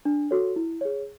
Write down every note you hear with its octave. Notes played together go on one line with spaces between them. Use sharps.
D4
F#4 A4 C#5
E4
G#4 C#5